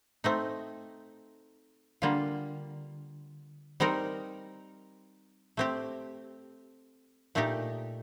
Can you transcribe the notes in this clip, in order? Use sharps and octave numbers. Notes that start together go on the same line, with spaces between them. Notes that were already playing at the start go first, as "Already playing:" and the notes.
A3 C4 D#4
D3 G3 A#3 F4
G3 C4 D#4 A#4
A3 C4 G4
A#2 A3 D#4 G4